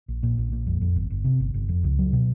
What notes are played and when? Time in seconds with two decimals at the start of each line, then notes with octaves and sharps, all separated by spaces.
0.08 A#1
0.23 A#2
0.38 A#1
0.52 A#2
0.67 F2
0.81 F2
0.96 G1
1.10 G1
1.25 C3
1.40 G1
1.54 G1
1.69 F2
1.84 C#2
1.99 F#3
2.13 B2